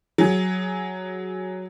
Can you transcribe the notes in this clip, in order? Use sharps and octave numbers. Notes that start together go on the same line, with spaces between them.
F#3 G#4